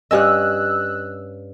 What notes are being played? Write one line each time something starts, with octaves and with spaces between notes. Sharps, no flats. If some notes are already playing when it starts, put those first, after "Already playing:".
G2 C#4 D#5 E6 F#6